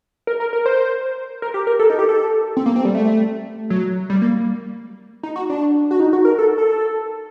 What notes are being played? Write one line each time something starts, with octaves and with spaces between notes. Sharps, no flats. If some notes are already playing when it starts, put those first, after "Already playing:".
A#4
A#4
A#4
C5
A#4
G4
A#4
A4
D#4
G4
A4
C4
A#3
C4
G3
A3
F#3
G3
A#3
D#4
F#4
D4
F#4
D#4
F#4
A#4
A4
A4